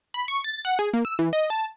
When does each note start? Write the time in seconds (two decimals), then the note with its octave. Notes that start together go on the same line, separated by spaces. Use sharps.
0.14 B5
0.28 C#6
0.44 A6
0.65 F#5
0.79 G#4
0.94 A#3
1.05 E6
1.19 E3
1.33 D#5
1.50 A5